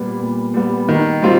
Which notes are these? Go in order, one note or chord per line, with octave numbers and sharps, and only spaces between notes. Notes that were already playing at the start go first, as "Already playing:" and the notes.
Already playing: A#2 G3 B3
A#2
G3 B3
D#3
G3 C4 F4